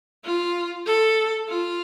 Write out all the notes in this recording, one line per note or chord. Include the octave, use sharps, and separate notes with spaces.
F4
A4
F4